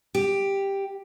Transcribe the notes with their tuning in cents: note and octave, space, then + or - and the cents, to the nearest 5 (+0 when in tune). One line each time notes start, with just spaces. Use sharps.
G4 +5